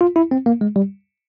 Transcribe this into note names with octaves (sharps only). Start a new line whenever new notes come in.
F4
E4
C4
A#3
G#3
G3